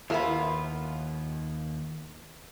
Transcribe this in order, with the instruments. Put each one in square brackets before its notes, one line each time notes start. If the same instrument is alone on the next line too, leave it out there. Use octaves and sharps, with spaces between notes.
[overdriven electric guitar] D#2 [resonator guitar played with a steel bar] B3 F4 [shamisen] E4 A#4 E5